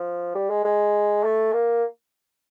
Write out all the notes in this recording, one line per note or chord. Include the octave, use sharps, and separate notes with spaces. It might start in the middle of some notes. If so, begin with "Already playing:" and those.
Already playing: F3
G3
G#3
G#3
A3
A#3